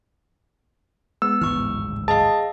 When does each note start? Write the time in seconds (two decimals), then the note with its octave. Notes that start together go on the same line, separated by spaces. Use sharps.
1.22 G#3 B3 E6
1.42 D1 G#1 E3 G#3 C#6 F6
2.08 G#4 D#5 F5 A5